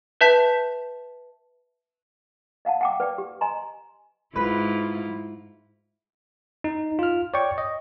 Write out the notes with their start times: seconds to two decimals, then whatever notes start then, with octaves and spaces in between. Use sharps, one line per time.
0.21 B4 E5 A5 G6 B6
2.65 D#5 F5 F#5 A5
2.81 F#5 G5 D6
3.00 B4 D5 G5
3.18 G4
3.41 D#5 G#5 A#5 C6
4.36 G#2 E4 F4 B4
6.64 D#4
6.99 F4 F6
7.34 C#5 D5 G5 C#6
7.58 D#5